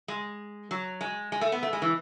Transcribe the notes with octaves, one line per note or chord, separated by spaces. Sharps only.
G#3
F#3
G#3
G#3
A3
B3
A3
G#3
E3